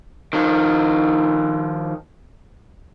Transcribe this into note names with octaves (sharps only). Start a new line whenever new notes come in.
D#3 F3